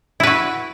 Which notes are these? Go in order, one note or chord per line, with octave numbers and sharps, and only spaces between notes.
E4 F#4 B4